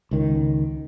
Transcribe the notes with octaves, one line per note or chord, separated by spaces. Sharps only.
C#2 D#3